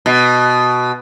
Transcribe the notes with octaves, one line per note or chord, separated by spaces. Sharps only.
B2